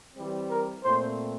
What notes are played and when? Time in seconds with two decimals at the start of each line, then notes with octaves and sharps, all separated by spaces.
0.15 E3 G3 C4
0.49 A#4
0.83 A#2 A3 C4 C5